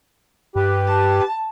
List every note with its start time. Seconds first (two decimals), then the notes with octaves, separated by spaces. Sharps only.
0.56 G2 G4 B4
0.87 A5